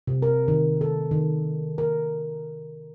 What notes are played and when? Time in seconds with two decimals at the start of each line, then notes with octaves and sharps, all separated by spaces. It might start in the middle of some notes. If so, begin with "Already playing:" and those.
0.07 C3
0.22 A#4
0.48 D#3
0.81 A4
1.11 D#3
1.78 A#4